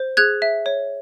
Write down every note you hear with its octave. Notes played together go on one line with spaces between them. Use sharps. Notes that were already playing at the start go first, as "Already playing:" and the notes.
Already playing: C5
G#4 F#6 G#6
E5
C#5